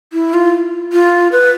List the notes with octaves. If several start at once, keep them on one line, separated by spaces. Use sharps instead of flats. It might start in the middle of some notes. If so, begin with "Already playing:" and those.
E4
F4
F4
B4